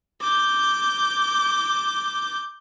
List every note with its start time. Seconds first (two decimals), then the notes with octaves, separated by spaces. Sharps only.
0.21 D6 G6